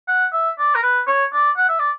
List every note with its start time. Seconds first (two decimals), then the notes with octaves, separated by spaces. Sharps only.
0.08 F#5
0.33 E5
0.59 D5
0.75 A#4
0.83 B4
1.07 C#5
1.33 D5
1.57 F#5
1.69 E5
1.79 D5